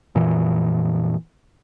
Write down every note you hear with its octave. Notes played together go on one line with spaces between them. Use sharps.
F2 A#2 E3